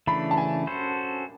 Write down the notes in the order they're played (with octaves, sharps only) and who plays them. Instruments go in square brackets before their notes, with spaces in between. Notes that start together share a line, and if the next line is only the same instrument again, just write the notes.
[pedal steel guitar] C#3 E3 A3 D4 [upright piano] B5
[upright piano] A5
G#5
[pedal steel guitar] C#4 F#4 A4 C5